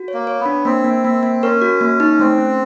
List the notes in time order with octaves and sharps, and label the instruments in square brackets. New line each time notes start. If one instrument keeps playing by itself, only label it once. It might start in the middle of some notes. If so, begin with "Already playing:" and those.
Already playing: [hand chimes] F#4
C#5
[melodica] A#3
[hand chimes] C#5
[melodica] B3
[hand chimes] D4
[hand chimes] A#3 [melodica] C4
[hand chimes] A#3
A#3
A#3
[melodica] C#4 [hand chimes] A#4
[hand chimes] F#4
A#3
D#4
[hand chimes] A3 [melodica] C4
[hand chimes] C#4